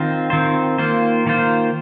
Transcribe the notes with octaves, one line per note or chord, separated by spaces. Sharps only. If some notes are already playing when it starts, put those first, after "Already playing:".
Already playing: D#3 C4 F4 C5
D#3 C4 F4 C5
D#3 A#3 F4 C5
D#3 A#3 F4 C5